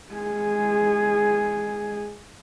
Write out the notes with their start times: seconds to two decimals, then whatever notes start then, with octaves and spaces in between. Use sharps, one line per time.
0.13 G#3 G#4